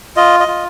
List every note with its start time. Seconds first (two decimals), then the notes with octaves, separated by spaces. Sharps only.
0.17 F4 D#5
0.40 D#5
0.48 F4